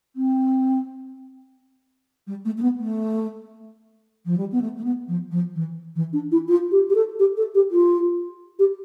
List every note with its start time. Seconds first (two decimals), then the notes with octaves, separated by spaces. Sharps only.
0.16 C4
2.27 G3
2.45 A3
2.58 A3
2.62 B3
2.79 A3
4.26 F3
4.38 G3
4.52 B3
4.61 A3
4.77 A3
4.84 B3
5.08 F3
5.31 F3
5.55 E3
5.96 E3
6.13 D4
6.32 E4
6.48 F4
6.72 G4
6.90 G4
6.95 A4
7.19 G4
7.37 A4
7.55 G4
7.71 F4
8.59 G4